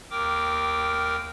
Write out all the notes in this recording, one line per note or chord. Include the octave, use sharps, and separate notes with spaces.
D#2 A#4 G5 D6